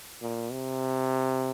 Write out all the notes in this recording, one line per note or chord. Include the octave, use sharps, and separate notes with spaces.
A#2
C3